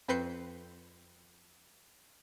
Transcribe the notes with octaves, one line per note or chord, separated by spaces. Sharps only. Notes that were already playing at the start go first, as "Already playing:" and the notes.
F2 C4 B4 G6 C7 C#7